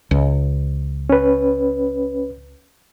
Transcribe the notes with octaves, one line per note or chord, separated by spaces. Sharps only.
C#2
C#4 B4